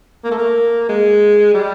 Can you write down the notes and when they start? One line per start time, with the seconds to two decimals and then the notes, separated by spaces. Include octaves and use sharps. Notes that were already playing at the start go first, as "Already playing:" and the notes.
0.24 A#3
0.31 A3
0.38 A#3
0.89 G#3
1.54 G3